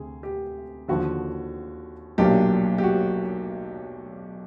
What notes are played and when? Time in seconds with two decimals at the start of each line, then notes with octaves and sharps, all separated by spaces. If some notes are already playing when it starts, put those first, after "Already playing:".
Already playing: D2 C3 G#4
0.23 G4
0.88 D#2 D3 F3 F#4
2.18 B1 A#2 F#3 A#3 D4 G4
2.78 G4
2.84 F#4